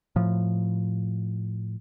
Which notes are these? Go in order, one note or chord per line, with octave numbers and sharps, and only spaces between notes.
A2 F3